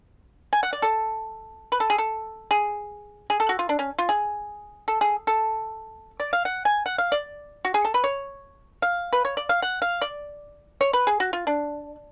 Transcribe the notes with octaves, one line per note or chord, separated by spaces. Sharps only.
G#5
F#5
D5
A4
B4
A4
G#4
A4
G#4
G#4
A4
F#4
F4
D4
C#4
F4
G#4
A4
G#4
A4
D5
F5
F#5
G#5
F#5
F5
D5
F#4
G#4
A4
B4
C#5
F5
B4
C#5
D5
F5
F#5
F5
D5
C#5
B4
G#4
F#4
F4
D4